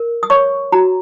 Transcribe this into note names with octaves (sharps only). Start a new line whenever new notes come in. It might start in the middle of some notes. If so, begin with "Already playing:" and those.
Already playing: A#4
D#6
C#5 C#6
F#4 A#5